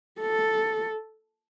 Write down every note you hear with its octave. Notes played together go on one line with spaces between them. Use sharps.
A4